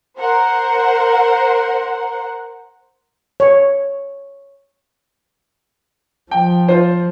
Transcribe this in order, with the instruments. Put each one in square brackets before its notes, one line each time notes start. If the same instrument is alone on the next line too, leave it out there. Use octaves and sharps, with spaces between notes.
[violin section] A#4 C5 F#5
[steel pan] C#5
[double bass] F3 [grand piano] G5
[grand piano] F4 C5